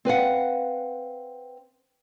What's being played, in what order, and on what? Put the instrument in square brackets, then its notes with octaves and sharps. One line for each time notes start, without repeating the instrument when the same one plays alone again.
[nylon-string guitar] C4 B4 F5 F#5